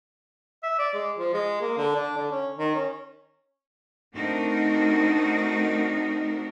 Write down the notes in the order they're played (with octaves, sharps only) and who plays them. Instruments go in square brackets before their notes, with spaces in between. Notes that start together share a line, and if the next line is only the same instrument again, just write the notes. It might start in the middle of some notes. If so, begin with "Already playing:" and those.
[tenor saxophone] E5
D5
G#3
F3
G#3
A#3
D3
D4
D3
C#4
D#3
C#4
[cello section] A3 C4 D4 D#4 F#4 A#4